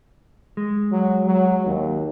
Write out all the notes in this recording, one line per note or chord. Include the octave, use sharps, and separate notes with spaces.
G#3
F#3
F#3
D#2